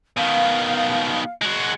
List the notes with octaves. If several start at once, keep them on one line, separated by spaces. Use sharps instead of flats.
B2 D#3 F5
G#3 F#4